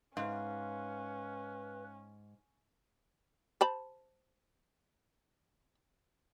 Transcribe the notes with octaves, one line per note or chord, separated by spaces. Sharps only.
G#2 C#4 B4 F5
C5 A5 B5